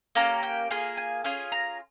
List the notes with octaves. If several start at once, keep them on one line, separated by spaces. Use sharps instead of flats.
A#3 C#4 G4 A#5
G5
A#3 F4 G#4 G#5
G#5
C#4 F4 G#4 G#5
A#5